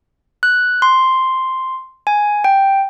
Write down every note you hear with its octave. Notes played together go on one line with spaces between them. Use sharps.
F#6
C6
G#5
G5